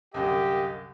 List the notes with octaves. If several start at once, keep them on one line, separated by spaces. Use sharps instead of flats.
C2 F#2 D3 G4 G#4 D#5 F5